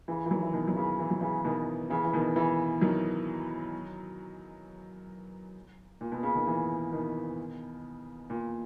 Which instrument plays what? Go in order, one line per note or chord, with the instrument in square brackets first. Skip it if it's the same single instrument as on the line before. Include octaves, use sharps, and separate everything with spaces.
[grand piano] C#3 E3
E3
D#3 F#3
E3
B2 D#3
F#3
C#3 E3
E3
F#3
C#3 E3
C#3
B2 D#3
C#3 E3
E3
B2 D#3
C#3 E3
D#3 F#3
A#2
B2
C#3
D#3
C#3 E3
B2 D#3
A#2